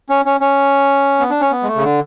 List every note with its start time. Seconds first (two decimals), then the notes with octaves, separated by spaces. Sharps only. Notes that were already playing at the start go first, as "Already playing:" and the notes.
0.10 C#4
0.25 C#4
0.40 C#4
1.19 B3
1.30 D4
1.41 C#4
1.51 B3
1.63 G#3
1.67 A3
1.76 C#3
1.83 D3